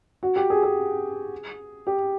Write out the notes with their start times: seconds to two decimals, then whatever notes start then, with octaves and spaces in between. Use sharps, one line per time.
0.23 F#4
0.36 G4
0.50 G#4
0.63 G#4
1.87 G4